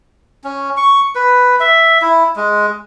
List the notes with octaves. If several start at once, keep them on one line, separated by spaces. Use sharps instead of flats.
C#4
C#6
B4
E5
E4
G#3